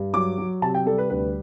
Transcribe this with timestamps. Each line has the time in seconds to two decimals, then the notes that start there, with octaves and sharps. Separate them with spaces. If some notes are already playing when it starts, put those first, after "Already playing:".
Already playing: G2
0.13 F#3 D6
0.38 F#3
0.62 C3 A5
0.74 G5
0.86 G3 A4
0.98 B4
1.10 D2 B4